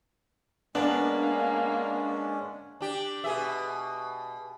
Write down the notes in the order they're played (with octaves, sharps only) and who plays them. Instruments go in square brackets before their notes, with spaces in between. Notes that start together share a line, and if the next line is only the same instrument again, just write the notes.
[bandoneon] G#3 C#4 [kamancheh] A#3 [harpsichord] B3 [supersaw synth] D4
[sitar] D4 G4
B2 G#4 E5